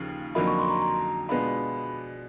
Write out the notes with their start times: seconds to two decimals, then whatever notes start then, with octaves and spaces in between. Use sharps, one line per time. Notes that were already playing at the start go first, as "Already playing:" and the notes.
Already playing: D#2 C#3 F3
0.35 F2 D3 F#3 A#3 D#4 B5
0.47 C#6
0.59 C6
0.70 A#5
0.82 A#5
1.29 B2 G#3 B3 D4 F4 B5